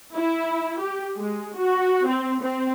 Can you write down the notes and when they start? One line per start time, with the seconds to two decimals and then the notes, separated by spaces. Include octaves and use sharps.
0.14 E4
0.79 G4
1.16 G#3
1.56 F#4
2.06 C4
2.41 C4